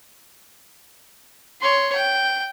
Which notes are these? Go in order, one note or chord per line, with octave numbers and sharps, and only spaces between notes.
C#5 C6
G5